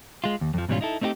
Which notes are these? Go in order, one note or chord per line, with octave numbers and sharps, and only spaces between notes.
G#3 F4
D#2
F2 F3
G#2 B2 E3 G3 C#4 F4
D#4 E4 A4
A3 C4 D#4 E4 G4